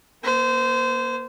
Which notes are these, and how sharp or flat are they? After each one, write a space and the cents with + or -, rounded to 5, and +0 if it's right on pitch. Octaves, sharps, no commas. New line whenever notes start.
A#3 +25 C5 -25